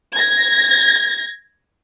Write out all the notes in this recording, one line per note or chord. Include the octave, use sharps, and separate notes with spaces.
G#6 A#6